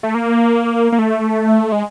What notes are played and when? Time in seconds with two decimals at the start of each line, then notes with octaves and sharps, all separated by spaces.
0.03 A3
0.15 A#3
0.92 A#3
0.99 A3
1.72 G#3